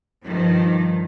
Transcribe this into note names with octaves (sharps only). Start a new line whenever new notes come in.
G2 D#3 F3